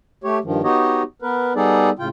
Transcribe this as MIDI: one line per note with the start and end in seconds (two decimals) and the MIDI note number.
0.24 0.39 57
0.24 0.39 67
0.24 0.39 73
0.44 0.61 43
0.44 0.61 51
0.44 0.61 53
0.63 1.03 59
0.63 1.03 63
0.63 1.03 66
0.63 1.03 67
0.63 1.03 73
0.63 1.03 75
1.22 1.53 59
1.22 1.53 70
1.22 1.53 71
1.56 1.90 55
1.56 1.90 59
1.56 1.90 63
1.56 1.90 68
1.56 1.90 69
1.56 1.90 74
1.99 2.08 45
1.99 2.08 49
1.99 2.08 65
1.99 2.08 79